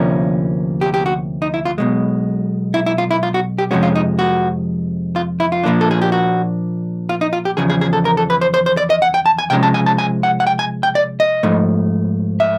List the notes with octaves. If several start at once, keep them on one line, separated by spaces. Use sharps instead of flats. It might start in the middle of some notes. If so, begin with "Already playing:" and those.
Already playing: D2 C3 F3 A#3 C#4
G4
G4
F#4
D#4
E4
F4
B1 B2 G#3
E4
E4
F4
E4
F4
F#4
G4
F2 C3 F3 G#3 C#4 F#4
F4
D#4
F#4
F4
E4
F4
A#2 F3 A#3 D4
A4
G#4
G4
F#4
F4
D#4
F4
G4
E2 C#3 F3 G#4
G#4
G#4
A4
A#4
A4
B4
C5
C5
C5
D5
D#5
F#5
G5
A5
G#5
C3 F3 G#3 C#4 G5
A5
G#5
A5
G#5
F#5
F#5
G5
G#5
G5
D5
D#5
G#2 F3 A3
E5